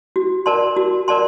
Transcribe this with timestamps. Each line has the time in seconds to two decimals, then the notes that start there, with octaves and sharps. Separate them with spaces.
0.16 F#4
0.46 A#4 D5 A5 C6
0.77 F#4
1.08 A#4 D5 A5 C6